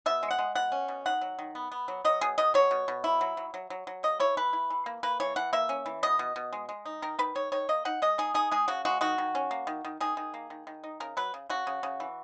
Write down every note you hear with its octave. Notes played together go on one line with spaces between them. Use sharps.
B2 E5
G#3
F#5
G#3
B2 F#5
C#4
B2
D#3 F#5
F#3
D#3
B3
B3
F#3
F#3 D#5
B2 G#4
B2 D#5
F#3 C#5
B2
B2
E4
F#3
F#3
F#3
F#3
F#3
A#3 D#5
E4 C#5
E3 B4
E4
E3
A#3
A#3 B4
E3 C#5
E3 F#5
A#3 E5
C#4
E3
B2 D#5
B2
B2
G#3
G#3
D#4
D#3 A#4
D#3 B4
D#3 C#5
D#3 C#5
A#3 D#5
D#4 F#5
G#3 D#5
D#4 G#4
D#4 G#4
G#3 G#4
C#3 F#4
G#3 F#4
D#3 F#4
D#3
C#4
A#3
D#3
D#3
D#3 G#4
D#3
A#3
D#3
D#3
D#4
C#3 A#4
F#3 B4
C#3
C#3 F#4
C#3
C#3
E3